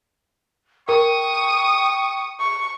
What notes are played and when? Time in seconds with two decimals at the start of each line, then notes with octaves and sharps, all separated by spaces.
0.89 A#4 G5 C#6 D#6
2.40 C#6